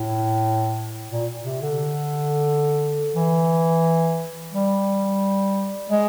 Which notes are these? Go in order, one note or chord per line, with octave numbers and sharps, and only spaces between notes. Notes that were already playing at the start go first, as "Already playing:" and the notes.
Already playing: A2
A#2
C3
D3
E3
G3
G#3